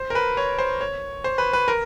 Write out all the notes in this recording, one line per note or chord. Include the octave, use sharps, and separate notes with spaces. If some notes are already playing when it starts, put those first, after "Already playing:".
Already playing: C5
A#4
B4
C#5
C5
C#5
C5
B4
B4
A#4